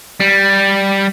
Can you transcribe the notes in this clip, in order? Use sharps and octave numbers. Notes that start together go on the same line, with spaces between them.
G3